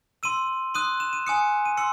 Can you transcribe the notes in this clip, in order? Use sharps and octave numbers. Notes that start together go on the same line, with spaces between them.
C6 E6 D#7
C6 D#6 F#6 D#7
E7
D#7
G#5 D#6 F#6 C#7
D#7
C6 E6 C#7